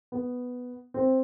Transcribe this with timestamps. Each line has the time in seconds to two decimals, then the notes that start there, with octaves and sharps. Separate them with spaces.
0.12 B3
0.94 C4